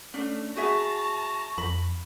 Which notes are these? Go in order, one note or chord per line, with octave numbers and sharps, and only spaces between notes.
A3 C#4 D4
F#4 G#4 E5 A5 A#5 C#6
C#6
F2 B5